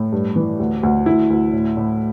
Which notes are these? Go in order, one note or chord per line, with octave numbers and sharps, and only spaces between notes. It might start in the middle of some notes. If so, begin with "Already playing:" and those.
Already playing: A2
G2
E3
D2
D2
D2 E4
D2
A2
A2